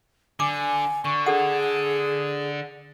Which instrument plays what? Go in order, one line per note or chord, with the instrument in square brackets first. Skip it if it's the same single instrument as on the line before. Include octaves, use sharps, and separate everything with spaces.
[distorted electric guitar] D3 [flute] G#5 [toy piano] D6
[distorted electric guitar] D3 [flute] C#6
[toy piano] D4 A4 F#5 [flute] G#4